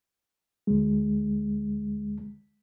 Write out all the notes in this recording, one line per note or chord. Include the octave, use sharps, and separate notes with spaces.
D2 G#3